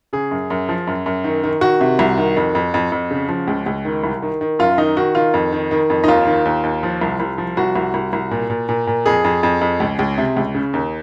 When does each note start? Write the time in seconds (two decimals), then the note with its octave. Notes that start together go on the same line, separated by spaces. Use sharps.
0.13 C#3 G#4
0.31 F#2
0.50 F#2
0.69 F3
0.87 F#2
1.06 F#2
1.24 D#3
1.44 D#3
1.61 D#3 F#4
1.81 C3
1.99 C2
2.18 D#3
2.37 F2
2.55 F2
2.74 F2
2.92 F2
3.11 C#3
3.29 F3
3.47 C#2
3.66 C#2
3.85 D#3
4.04 C2
4.22 D#3
4.41 D#3
4.59 F#2 F4
4.78 D#3 D#4
4.97 D#3 F#4
5.15 D#3 F4
5.34 F2
5.52 D#3
5.71 D#3
5.90 F2
6.04 D#4
6.08 D#2 F4
6.27 D#3
6.45 D#2
6.63 D#2
6.83 F3
7.01 C2
7.20 C2
7.38 F3
7.57 C2 F#4
7.76 C2
7.94 C2
8.13 C2
8.31 A#2
8.50 A#2
8.69 A#2
8.87 A#2
9.06 F2 G#4
9.24 F2
9.43 F2
9.61 F2
9.80 C#2
9.99 C#2
10.18 C3
10.37 C#2
10.55 C#3
10.73 D#2